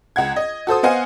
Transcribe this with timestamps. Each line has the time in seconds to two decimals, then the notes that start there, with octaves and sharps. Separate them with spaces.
0.16 C#2 F#5 G#6
0.36 D#5
0.67 F#4 A4 C5 D#6
0.83 B3 C5 D#5 F5 F#5 G#5